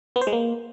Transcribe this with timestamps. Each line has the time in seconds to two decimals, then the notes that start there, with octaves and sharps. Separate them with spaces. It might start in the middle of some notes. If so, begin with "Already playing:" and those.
0.16 B3
0.21 C5
0.27 G#3
0.33 A#3